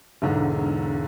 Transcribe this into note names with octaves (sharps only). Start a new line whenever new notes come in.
E1 B1 E2 G#2 D3